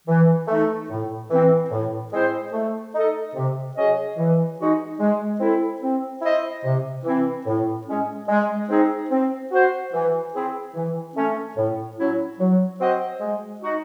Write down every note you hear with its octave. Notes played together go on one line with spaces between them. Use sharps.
E3
A3 D#4
A2
E3 C4
A2
G#3 C4 E4 C5
A3
D#4 A4 D#5
C3
F#3 C#4 G#4 D#5
E3
G#3 D#4 F#4
G#3
C4 E4 A4
C4
E4 C5 D#5
C3
E3 C4 E4
A2
G#3 C#4
G#3
C4 D#4 G#4
C4
F#4 C5
E3
C4 E4 G#4
E3
A3 C#4
A2
F#3 C#4 E4
F#3
C4 F#4 C5 D#5
G#3
D#4 F#4